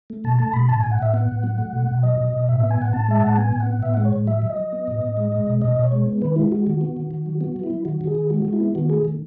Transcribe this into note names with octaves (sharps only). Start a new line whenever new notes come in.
A3
B2 A5
A3 A5
B2 B5
A2 A5
A2 G#5
F#5
A2 E5
B3 F#5
A2
F#3
A3
B2
B2
F#3 D#5
B2
B2
A2 E5
B3 E5
G#5
A2 F#5
A2 A5
G#3 E5
A2 F#5
B3 G#5
A2
F#5
B3
A2 E5
G#3 F#5
C#5
A2
F#3 E5
F#3
D#5
F#3
B3
A2
A2
G#3
G#3
B2
B2 D#5
B2
C#5
G#3
B3
D#3 B4
G#3 E4
G#3 F#4
D#3 F#4
B3 F#4
D#3
D#3
F#3
B3 F#4
F#3
E4
F#3
D#3 F#4
D#3
G#4
D#3
G#3 F#4
G#3 F#4
E4
B3
D#3 F#4
A3 G#4
D#3